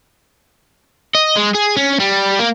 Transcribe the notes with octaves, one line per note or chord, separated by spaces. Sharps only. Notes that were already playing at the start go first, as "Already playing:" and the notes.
D#5
G#3
G#4
C#4
G3
A#3